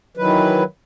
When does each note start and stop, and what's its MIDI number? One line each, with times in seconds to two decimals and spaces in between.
0.17 0.64 51
0.17 0.64 52
0.17 0.64 54
0.17 0.64 71